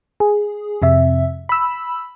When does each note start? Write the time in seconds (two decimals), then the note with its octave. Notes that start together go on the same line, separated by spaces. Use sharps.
0.20 G#4
0.82 F2 C3 E5
1.49 B5 E6